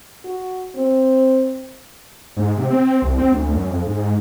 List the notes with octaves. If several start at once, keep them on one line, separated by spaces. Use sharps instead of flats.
F#4
C4
G#2
C3
C4
C2
C4
D2
F#2
F2
G#2